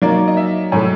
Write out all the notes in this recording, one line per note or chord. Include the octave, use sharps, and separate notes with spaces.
F#3 A#3 D#4 D5
D#5
E5
A2 F#3 A3